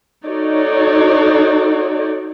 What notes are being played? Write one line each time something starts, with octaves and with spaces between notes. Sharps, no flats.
D#4 F#4 A4 C#5 D5